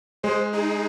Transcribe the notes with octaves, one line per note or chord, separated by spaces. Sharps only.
G#3 G#4 C5
D#4 G#4